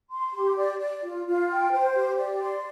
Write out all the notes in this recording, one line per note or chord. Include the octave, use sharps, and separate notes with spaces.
C6
G4
D5
D5
F4
F4
G5
C5
G4
D5
C6